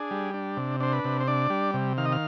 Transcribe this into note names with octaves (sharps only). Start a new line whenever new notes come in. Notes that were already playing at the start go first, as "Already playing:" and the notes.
Already playing: D4 G#4
G3
D4
C3
D4 C5
B4
C3
C5
D4 D5
G3
C3
D#3 F5
D#5
F5